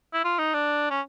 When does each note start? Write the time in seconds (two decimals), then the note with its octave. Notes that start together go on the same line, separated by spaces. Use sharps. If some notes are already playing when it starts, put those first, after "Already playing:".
0.14 E4
0.24 F4
0.39 D#4
0.54 D4
0.91 C#4